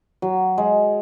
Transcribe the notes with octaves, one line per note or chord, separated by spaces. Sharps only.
F#3
G#3